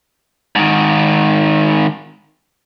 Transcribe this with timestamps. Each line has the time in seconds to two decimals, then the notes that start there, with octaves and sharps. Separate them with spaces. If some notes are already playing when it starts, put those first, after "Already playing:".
0.56 G#2 D#3